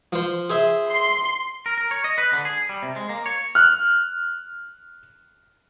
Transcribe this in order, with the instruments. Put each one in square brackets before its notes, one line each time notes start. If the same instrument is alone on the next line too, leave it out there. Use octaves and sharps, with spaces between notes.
[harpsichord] F3 C5
G#4 C5 E5
[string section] C6
[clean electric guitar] A#4
A#4
C#5
D#5
B4
D3
G#4
G3
C3
G#3
A#3
C#5
[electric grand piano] F6 F#6